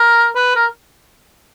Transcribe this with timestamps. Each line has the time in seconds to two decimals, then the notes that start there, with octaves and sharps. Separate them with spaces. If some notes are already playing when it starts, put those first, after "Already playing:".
Already playing: A#4
0.35 B4
0.56 A#4